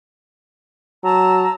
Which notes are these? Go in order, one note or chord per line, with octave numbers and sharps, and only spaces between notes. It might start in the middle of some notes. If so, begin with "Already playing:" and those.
F#3 A5 A#5 E6